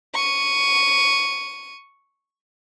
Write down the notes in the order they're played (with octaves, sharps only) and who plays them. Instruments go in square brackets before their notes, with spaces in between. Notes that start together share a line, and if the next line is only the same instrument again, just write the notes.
[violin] C#6 D#7